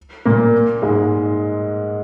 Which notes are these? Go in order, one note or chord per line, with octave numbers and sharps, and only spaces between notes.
A#2 A#3
G#2 G#3